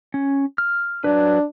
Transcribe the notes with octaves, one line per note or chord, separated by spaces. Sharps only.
C#4
F6
F#3 D4 B4